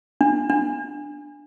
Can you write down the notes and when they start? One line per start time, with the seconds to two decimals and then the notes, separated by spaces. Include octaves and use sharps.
0.21 D4
0.50 D4